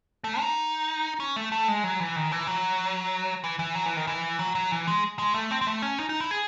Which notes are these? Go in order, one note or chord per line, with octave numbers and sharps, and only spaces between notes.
A3
D#4
C#4
A3
A3
G#3
F#3
E3
D#3
E3
F#3
E3
E3
F#3
E3
D#3
E3
F#3
F#3
E3
G#3
G#3
A3
C4
C4
A3
C#4
D#4
D#4
E4
G#4